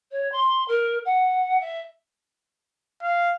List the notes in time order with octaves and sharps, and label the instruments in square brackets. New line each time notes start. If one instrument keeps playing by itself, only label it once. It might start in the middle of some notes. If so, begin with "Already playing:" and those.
[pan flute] C#5
C6
A#4
F#5
E5
[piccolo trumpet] F5